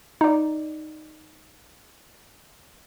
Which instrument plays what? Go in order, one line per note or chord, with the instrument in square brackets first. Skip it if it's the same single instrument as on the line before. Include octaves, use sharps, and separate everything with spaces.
[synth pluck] D#4 D5